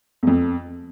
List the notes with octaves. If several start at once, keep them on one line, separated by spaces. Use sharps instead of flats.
E2
F2